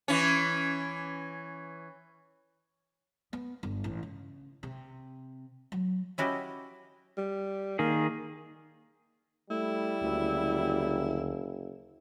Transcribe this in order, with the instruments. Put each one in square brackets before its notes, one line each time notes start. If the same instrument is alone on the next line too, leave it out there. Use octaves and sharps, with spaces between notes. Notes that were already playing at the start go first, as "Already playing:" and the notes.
[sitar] E3 C#4
[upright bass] B3
G1
A1
C#3
C3
F#3
[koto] C#4 E4 F#4 G4 D#5
[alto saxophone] G3
[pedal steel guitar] D#3 G#4 [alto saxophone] A#3
[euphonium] G3 [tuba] A3 [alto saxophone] E4
[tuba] F#1 [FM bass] D2